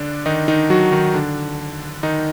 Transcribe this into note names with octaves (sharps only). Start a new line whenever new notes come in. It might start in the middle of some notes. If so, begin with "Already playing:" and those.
Already playing: D3 D4
D#3 D#4
D#3 D#4
F#3 F#4
D#3 D#4
D3 D4
D#3 D#4